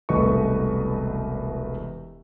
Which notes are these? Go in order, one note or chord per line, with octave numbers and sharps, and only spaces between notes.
E1 C2 A3 B4 D#5 C#6